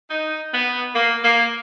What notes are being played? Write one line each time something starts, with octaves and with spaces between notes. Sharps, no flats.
D#4
B3
A#3
A#3